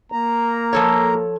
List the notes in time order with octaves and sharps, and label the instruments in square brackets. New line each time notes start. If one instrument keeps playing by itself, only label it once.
[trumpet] A#3 [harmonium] A#5
[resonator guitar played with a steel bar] F3 A4 C#5